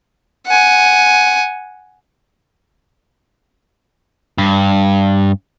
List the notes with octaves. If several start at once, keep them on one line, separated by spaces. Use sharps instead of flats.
F#5 G#5
G2